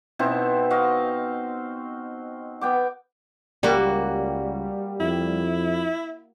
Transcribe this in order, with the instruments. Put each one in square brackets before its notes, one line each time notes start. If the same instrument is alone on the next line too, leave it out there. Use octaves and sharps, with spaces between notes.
[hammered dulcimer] B2 C4 D#4 E4
F#4 D#5 F5
B3 G5 D6
[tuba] C#2 [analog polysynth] G3 [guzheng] A#3 F#4
[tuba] F2 [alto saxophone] E4